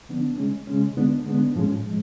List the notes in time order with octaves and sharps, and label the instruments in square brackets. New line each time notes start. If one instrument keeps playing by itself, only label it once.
[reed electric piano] D3 F3 B3 D4
C#3 G#3 C#4
C#3 G#3 C#4
D3 G#3 B3 D4
D3 G#3 B3 D4
A2 F3 G#3 C#4
A2 F3 G#3